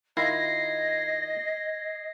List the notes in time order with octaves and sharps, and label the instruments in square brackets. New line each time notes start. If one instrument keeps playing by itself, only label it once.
[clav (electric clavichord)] D#3 E4 F4 [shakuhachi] D#5 [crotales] G#6 A#6 C7